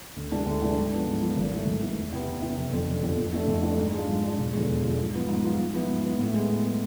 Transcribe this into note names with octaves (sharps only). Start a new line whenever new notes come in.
D2
C3 E3 G#3 D4
D2
C3 E3 G#3 D4
G#2
F3 B3 D4
G#2
F3 B3 D4
G#1
G#2 E3 A3
G#1
G#2 E3 A3
E2
C3 E3 B3
E2
C3 E3 B3
F1
F2 D3 F3
F1
F2 D3 F3
F2
E3 A3 D4
F2
E3 A3 D4
G#2
G#3 D4 F4
G#2
G#3 D4 F4
E1
E2 D3 F3 G#3
E1
E2 D3 F3 G#3
G#2
F3 B3 F4
G#2
F3 B3 F4
G#2
F3 B3 E4
G#2
F3 B3 E4
A2
G#3 B3
A2
G#3 B3